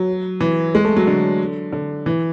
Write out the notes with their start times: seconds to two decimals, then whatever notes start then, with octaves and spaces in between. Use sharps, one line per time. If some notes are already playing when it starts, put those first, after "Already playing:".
Already playing: F#3
0.40 E3
0.75 G#3
0.85 A3
0.96 F#3
1.07 D3
1.73 D3
2.06 E3